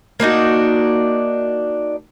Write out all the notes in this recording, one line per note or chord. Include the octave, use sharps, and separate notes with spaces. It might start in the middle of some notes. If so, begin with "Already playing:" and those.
A#3 D4 D#4 F#4